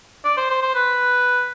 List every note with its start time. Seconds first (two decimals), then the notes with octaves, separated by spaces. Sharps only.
0.24 D5
0.37 C5
0.50 C5
0.62 C5
0.74 B4